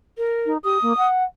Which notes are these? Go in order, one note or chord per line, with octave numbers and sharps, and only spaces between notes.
A#4
D#4
G4 D#6
A#3
F#5